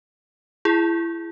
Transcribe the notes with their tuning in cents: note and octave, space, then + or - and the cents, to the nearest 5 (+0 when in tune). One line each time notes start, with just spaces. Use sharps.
E4 +30 G#4 +0